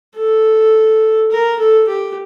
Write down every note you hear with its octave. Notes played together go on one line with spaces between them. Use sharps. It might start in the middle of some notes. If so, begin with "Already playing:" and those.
A4
A#4
A4
G4